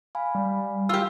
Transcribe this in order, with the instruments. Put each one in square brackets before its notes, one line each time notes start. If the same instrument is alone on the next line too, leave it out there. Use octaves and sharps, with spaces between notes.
[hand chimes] F5 G#5 B5
[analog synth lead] G3
[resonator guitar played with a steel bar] F4 G4 [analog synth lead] E6